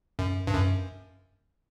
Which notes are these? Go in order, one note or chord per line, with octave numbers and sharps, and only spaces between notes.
F#2
G2
F#2